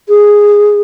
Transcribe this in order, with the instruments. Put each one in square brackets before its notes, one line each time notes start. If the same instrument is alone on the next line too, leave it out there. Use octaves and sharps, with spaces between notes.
[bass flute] G#4